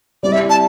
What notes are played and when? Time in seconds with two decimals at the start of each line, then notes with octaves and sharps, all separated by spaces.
0.23 G3 C4 E4 G4 D5
0.32 E5
0.50 A5